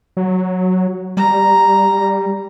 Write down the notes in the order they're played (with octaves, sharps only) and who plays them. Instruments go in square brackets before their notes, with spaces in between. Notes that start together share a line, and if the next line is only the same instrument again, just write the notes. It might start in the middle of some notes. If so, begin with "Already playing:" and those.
[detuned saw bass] F#3
[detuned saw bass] G3 [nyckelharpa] A#5